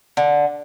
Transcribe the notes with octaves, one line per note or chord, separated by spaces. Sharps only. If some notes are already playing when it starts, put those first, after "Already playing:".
D3